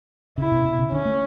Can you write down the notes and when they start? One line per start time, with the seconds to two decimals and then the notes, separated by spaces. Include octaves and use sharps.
0.38 C#3 E4
0.52 B2
0.65 B2
0.79 C#3
0.92 D3 C#4
1.05 A3